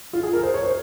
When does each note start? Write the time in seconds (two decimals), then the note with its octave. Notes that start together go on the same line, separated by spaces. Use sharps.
0.13 F4
0.23 G#4
0.33 A#4
0.43 C5
0.54 C#5
0.64 C5